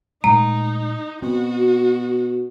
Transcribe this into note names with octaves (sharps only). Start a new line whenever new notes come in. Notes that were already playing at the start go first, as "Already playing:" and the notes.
A#2 G#3 A3 D#4 A#5
B2 C4 F#4